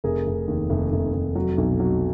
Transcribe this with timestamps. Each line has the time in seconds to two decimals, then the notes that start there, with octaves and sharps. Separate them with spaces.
0.04 F1 G#4 A#4
0.26 F1
0.48 D#2
0.69 F1
0.92 F1
1.14 F1
1.35 F#3
1.58 B1
1.80 F#3